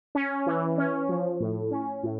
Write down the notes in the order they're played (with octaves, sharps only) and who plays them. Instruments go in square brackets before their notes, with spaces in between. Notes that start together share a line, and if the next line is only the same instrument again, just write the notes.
[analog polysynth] C#4
E3
C#4
F3
A2
C#4
A2